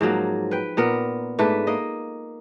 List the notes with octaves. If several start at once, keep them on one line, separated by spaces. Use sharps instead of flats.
G#2 F3 F#3 A#3
B4 G5
A#2 B3 A#4
G#2 A3 D4 B4
A#3 D#5